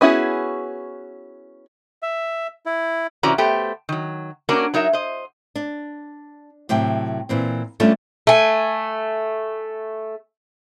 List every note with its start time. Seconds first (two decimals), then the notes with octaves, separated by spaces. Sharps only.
0.01 B3 C#4 E4 F#4 G#4
2.02 E5
2.66 E4
3.23 C3 E3 C#4 F#4 D5 A#5
3.38 A3 B3 G4 C5 G5
3.89 D#3 F#3
4.49 A#3 C#4 D4 F#4 A#4 D5
4.74 F#3 D#4 A#4 E5
4.93 C5 D#5
5.55 D4
6.69 A2 C3 F#3 G5
7.29 A#2 E3 C4
7.80 G3 A3 C#4 D4 F4 A4
8.27 A3 G#5